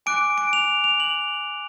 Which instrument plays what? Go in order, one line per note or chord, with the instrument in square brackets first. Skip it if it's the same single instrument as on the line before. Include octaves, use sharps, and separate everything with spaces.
[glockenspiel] G#5 D6 F#6 D7
D7
F7
F7
F#7